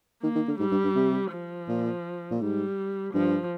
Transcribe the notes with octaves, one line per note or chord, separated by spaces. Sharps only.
D#3 A#3
D#3
D3
G#2 G3
G2
G2
C3
F3
A#2
A#2
G#2 G3
G2 F3